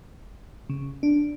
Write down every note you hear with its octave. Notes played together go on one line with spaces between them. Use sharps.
C#3
D4